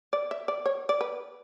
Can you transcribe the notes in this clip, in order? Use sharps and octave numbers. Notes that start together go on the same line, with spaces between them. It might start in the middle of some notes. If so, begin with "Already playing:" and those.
D5
E5
D5
C#5
D5
B4